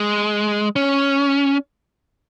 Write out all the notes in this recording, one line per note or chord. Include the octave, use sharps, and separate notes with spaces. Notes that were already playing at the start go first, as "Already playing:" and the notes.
Already playing: G#3
C#4